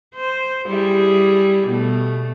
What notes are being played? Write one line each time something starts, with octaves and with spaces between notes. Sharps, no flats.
C5
G3 E4 G#4
B2 A3